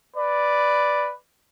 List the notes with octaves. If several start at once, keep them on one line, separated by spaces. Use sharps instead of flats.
B4 D5